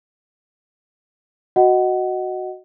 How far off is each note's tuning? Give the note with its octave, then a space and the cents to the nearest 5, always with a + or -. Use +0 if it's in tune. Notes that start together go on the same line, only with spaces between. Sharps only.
F#4 +0 D#5 +0 F#5 +20